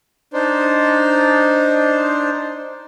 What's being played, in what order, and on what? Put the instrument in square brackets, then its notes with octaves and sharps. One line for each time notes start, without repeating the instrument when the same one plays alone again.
[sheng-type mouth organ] D4 D#4 C5